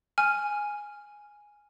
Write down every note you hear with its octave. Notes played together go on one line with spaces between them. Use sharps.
G#5 F6